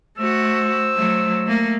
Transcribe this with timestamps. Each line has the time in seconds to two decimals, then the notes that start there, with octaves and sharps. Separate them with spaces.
0.18 A3 F#4 C5 E6
0.95 F#3 A3
1.46 A3 A#3